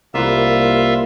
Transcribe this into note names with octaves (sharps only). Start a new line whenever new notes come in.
C2 A#3 F4 B4 E5